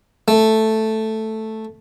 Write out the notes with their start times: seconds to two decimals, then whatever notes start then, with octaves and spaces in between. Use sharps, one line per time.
0.28 A3